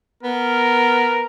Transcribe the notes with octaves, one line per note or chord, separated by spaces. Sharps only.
B3 A#4